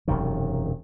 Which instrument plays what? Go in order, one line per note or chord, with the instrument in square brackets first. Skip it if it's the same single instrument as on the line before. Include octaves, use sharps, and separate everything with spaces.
[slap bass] E1 F#2 C3 D#3